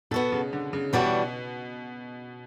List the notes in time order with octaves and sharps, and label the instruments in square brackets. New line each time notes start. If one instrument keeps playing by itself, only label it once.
[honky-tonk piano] B2 [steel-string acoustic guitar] B3 F#4 A4
[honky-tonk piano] C#3
D3
C#3
[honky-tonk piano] B2 [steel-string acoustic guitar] E3 G3 D4 F#4 C#5